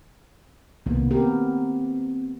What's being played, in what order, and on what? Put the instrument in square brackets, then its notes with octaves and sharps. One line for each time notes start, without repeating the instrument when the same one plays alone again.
[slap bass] C2 B2 [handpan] D#3 A#3 B3
[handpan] B3 G4 A#4 [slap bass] C4